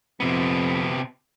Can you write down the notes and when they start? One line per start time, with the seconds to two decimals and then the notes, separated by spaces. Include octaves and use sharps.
0.20 F2 C3 B3